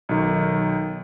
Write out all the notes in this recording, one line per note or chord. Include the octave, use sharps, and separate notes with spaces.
B1 D#3